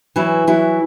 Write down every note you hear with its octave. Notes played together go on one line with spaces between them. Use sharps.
E3 F#3 E4
E3 F#3 E4